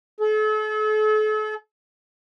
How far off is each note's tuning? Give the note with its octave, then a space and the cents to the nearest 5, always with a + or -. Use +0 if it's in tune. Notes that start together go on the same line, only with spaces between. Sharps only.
A4 -40